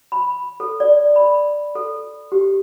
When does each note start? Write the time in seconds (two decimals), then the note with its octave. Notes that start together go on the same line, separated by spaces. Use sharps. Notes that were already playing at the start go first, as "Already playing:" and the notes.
0.12 B5
0.60 A4
0.80 D5
1.16 B5
1.75 A4
2.32 G4